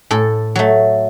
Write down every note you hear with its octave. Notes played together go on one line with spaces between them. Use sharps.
A2 A4
F#3 A3